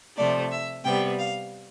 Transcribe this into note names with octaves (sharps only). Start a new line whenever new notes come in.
C3 F3 A3 D5
E5
C3 G3 B3 G5
F5